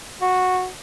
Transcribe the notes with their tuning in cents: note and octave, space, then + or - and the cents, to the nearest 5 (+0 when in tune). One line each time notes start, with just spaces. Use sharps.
F#4 -10